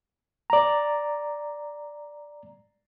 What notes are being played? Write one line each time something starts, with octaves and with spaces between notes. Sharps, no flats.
D5 A#5